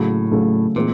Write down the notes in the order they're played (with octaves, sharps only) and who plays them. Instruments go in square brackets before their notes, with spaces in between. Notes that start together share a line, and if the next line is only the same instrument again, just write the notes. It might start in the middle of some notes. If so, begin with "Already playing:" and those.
Already playing: [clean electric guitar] A2 [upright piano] C#3 F#3 A3
[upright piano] C#3 F#3 A3
[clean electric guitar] A#2 [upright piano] E3 G#3 C4